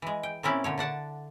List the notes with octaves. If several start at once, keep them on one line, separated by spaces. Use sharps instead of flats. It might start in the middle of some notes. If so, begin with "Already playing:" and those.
E3 G#3
G5
A#2 C4 C#4 E4 D5
A#2 D3 C#5
D3 D4 F#5 A5